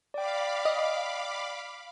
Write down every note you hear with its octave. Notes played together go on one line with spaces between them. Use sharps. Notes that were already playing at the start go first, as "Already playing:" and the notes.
D5 F5 G5 B5 D6
D#5